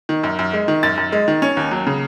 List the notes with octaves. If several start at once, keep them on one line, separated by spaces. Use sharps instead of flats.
D#3
F#2
F#2
G#3
D#3
F#2 A6
F#2
G#3
D#3
C#4
D#2
F#3
C#3